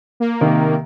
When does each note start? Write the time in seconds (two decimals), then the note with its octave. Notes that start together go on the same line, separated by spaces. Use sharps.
0.20 A#3
0.41 C3 D#3